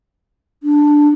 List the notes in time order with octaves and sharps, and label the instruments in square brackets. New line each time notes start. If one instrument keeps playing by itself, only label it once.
[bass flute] D4